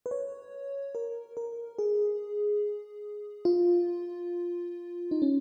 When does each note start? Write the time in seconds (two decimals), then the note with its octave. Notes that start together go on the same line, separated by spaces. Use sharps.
0.06 B4
0.11 C#5
0.95 A#4
1.37 A#4
1.79 G#4
3.45 F4
5.11 D#4
5.22 C#4